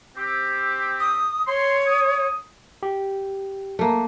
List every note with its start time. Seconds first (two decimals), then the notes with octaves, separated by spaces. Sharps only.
0.16 C4 G4
1.00 D#6
1.47 C#5 C6
1.87 D#6
2.83 G4
3.79 A3 A#3